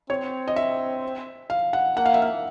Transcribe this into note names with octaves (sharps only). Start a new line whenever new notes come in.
C4 C#5
D#5
E5
F5
F#5
A#3 F#5
F5
E5
F5